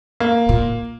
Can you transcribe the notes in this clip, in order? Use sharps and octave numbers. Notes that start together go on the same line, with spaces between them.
A#3
A#2